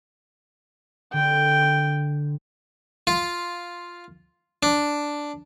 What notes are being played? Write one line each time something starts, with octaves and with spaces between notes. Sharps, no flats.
D3 G5
F4
D4